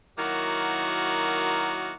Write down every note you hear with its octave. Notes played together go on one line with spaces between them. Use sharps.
D#3 F#3 A#3 E4 F#4